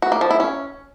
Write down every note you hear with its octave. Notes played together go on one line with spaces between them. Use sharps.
F#4
A#3
F3
E4
C#4